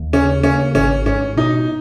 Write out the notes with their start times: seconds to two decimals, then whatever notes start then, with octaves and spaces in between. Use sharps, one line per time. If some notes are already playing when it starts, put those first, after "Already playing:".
Already playing: D#2
0.13 C#3 C#4
0.43 A#3 C#4
0.75 G#1 C#4
1.06 G#2 C#4
1.37 B2 D#4